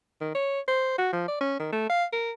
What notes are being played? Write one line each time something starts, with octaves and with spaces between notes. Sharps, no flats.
D#3
C#5
C5
F#4
F3
D5
C#4
D#3
A3
F5
A#4